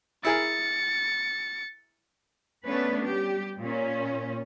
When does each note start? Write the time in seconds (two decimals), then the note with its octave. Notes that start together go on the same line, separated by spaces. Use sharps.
0.25 E4 G#4 A#4 A6 C#7
2.65 A3 B3 C#4 D4 B4
3.04 G3 G4
3.59 A#2 C#4